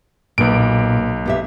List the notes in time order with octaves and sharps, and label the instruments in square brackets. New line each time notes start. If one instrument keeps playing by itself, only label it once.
[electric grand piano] B1 D7 [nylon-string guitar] A#2 B4
[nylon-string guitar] B3 G4 E5